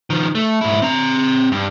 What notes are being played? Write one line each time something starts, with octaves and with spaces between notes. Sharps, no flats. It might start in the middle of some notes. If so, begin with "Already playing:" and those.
D#3 F3
A3
G#2 E4
C4 A#5
G2